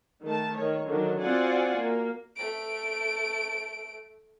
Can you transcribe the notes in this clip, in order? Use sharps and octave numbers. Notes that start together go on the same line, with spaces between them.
D#3 A3 A5
D#3 C#5
D3 D#3 F#3 D4
C4 F4 F#4 D5 F#5 G#5
A#3
A3 D7